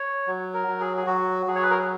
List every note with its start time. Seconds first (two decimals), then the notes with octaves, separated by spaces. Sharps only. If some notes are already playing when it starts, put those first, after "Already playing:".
Already playing: C#5
0.27 F#3
0.54 A#4
0.68 F#3
0.80 G#4
0.97 G#4
1.06 F#3 F#4
1.46 F#3 G#4
1.56 C#5
1.63 B4
1.71 A#4
1.79 G#4